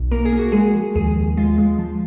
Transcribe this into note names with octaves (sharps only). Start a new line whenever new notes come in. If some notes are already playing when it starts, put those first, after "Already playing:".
Already playing: B1
A#3 A#4
G#4
A#3
F#4
G#3 G#4
F3
D#2 G#4
D#2
G#3 F4
G#3
F3